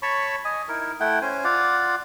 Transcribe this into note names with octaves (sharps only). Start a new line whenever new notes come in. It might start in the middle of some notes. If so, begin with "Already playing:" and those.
C#5 A5 B5 C#6
D#5 G#5
D#4 E4 A#4
A3 E4 F#5 G5
C#4 C5 G#5
F4 D5 F5 F#5